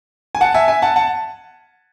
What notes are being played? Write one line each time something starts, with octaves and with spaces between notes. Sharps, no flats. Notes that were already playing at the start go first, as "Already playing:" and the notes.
G#5
F#5 A5
E5 G#5
E5 G#5
F#5 A5
F#5 A5